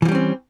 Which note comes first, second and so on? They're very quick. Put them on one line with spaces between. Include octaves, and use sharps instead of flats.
E3 F3 G3 C#4 C4